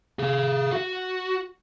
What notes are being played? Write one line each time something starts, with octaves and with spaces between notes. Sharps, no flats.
G#4 F5
F#4